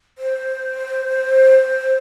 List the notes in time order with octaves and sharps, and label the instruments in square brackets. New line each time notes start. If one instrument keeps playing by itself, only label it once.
[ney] C5